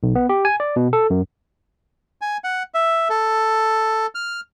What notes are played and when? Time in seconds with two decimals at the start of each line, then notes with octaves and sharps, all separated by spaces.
0.03 B1
0.15 B3
0.29 G4
0.45 G#5
0.60 D5
0.76 B2
0.93 A4
1.10 F#2
2.21 G#5
2.44 F#5
2.74 E5
3.09 A4
4.15 F6